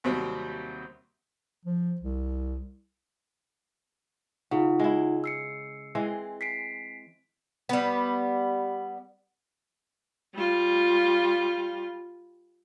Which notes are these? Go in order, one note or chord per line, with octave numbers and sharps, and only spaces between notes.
D#2 C3 F#3 G3 C4
F3
C2
C#3 D#4 F4 F#5
G#3 E4
E6 C7 C#7
E3 G#3 C4
B6 C7 D7
G3 B3
G3 F4